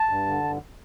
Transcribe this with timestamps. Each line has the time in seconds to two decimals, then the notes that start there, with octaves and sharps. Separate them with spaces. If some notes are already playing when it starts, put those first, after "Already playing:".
Already playing: A5
0.09 G2
0.27 D3
0.44 G2